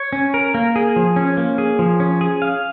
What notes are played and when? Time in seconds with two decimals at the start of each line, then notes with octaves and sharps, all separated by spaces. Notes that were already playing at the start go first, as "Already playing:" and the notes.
Already playing: C#5
0.13 C#4
0.34 A#4
0.54 A#3
0.76 G#4
0.96 F3
1.16 C#4
1.37 A#3
1.58 G#4
1.79 F3
2.00 C#4
2.21 G#4
2.42 F5